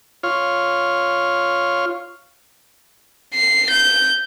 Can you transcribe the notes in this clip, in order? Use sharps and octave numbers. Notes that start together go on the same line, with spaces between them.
F4 C#5 F6
C7
G6